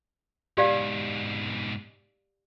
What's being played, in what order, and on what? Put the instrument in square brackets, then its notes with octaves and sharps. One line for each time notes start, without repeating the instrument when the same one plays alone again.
[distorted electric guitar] G#2 B2 [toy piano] G4 D5 F5